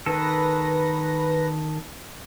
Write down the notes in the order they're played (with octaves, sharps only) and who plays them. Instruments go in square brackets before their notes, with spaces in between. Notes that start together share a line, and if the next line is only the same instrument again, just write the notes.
[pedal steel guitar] D#3 A4 [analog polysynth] B4 A#6